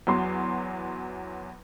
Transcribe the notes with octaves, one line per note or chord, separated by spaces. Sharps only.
E2 F#3 C6